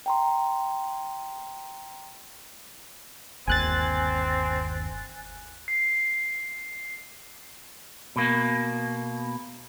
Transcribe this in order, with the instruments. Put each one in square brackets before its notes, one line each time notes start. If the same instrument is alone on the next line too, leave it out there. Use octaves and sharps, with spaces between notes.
[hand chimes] G5 A#5 C6
[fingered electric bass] G1 D#2 [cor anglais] C4 [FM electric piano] G#5 F#6 A6
[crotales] C7
[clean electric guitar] B2 A#3